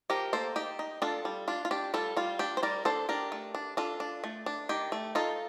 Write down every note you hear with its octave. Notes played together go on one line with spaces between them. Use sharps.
F3 G4 A#4
A#3 A4 C5
D#4 G4
D#4
D4 F4 A4
G3
D4 F4
F4
D4 G4
G3 F4 A4
G3 F4
D4 G4
C5
G3 A#4 D5
D4 A4 C5
D4 G4 A#4
A3
D4
D4 F4 A4
D4
A3
D4
D#3 G4
A3
D#4 F4 A4